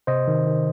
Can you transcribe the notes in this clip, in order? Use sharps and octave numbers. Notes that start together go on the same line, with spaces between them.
C3 C5 D#5
D#3
D#3